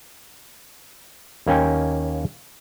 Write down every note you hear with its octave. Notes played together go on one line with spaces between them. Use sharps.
D#2 A#3 C#4 G5 G#5